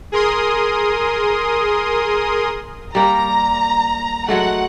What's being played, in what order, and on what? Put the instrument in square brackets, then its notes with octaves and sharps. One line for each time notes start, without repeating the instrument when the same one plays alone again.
[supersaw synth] G#4 A#4 C6 D#6
[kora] G3 A#3 [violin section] A#5
[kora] F#3 G#3 A3 [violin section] F#5